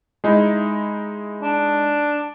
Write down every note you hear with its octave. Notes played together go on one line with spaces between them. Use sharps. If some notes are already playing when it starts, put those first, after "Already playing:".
G#3 D#4 E4
D4